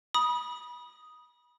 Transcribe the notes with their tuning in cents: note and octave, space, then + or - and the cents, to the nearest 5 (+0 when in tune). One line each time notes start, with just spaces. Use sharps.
B5 -30 D#6 +0